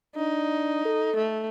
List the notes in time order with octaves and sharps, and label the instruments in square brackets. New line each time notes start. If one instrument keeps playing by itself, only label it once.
[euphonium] D4 [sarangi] D#4
[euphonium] A4
[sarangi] A3